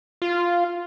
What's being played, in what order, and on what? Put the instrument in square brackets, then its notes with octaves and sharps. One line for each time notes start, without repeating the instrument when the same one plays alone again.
[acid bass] F4